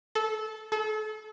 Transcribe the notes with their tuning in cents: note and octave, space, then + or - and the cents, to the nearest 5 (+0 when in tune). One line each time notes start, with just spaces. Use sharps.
A4 -20
A4 -35